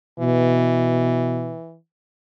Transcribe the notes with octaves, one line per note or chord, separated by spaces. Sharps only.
B2 E3